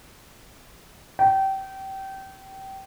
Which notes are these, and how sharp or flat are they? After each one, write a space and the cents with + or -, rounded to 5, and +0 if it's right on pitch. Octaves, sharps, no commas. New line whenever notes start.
G5 -25